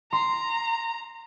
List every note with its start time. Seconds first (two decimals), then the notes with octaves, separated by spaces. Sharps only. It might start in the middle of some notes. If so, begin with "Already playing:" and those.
0.13 A#5 C6